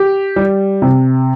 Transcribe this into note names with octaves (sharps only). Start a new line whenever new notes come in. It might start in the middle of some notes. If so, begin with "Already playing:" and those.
Already playing: G4
G3
C3